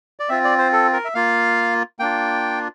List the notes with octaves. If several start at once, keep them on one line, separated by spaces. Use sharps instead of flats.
D5
C4 F4 E5
D5
C5
A4
A#4
E5
A#3 F4 F5
A#3 D4 F4 G5